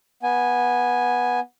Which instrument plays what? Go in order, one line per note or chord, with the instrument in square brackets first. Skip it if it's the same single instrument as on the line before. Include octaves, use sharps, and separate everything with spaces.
[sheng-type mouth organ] B3 G#5